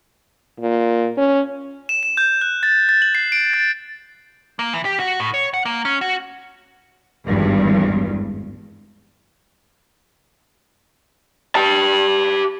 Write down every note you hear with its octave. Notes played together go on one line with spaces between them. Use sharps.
A#2
C#4
E7
E7
G6
F#6
A6
A6
F#7
C7
D7
A6
A#3
E3
G4
F#4
A2
C#5
F#5
A#3
C#4
F#4
G#1 E2 G2
G4 A5